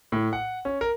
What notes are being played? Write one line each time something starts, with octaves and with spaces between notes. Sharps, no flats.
A2
F#5
C#4
A#4